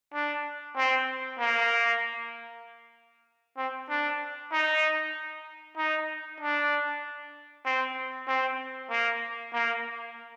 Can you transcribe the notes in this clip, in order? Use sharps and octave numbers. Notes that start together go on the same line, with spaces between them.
D4
C4
A#3
C4
D4
D#4
D#4
D4
C4
C4
A#3
A#3